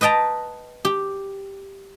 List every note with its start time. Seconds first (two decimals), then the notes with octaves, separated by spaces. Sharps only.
0.01 B4 D#5 G5 A5 A#5
0.85 G4